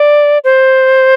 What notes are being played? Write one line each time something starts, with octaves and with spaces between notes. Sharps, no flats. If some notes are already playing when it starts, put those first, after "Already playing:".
Already playing: D5
C5